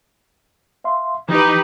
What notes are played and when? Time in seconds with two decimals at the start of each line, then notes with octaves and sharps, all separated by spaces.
0.84 E5 F5 C6
1.29 E3 D#4 G4 B4